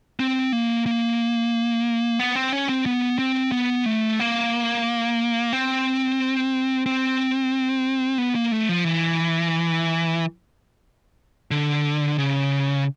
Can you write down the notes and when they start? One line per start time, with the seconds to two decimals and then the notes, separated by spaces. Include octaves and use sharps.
0.20 C4
0.53 A#3
0.86 A#3
2.19 B3
2.35 C4
2.52 C#4
2.69 C4
2.86 B3
3.19 C4
3.52 B3
3.86 A3
4.20 A#3
5.53 C4
6.86 C4
8.18 B3
8.35 A#3
8.52 A3
8.69 F3
8.85 E3
11.51 D3
12.18 C#3